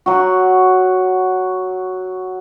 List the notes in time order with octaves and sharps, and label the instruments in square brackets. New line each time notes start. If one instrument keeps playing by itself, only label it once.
[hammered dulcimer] F#3 F#4